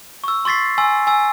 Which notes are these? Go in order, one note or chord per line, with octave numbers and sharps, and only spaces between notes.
C#6 E6
C6 C#6 A6 B6 C7
G#5 C6 E6
G#5 E6